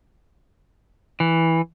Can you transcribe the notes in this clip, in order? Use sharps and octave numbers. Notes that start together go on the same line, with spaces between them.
E3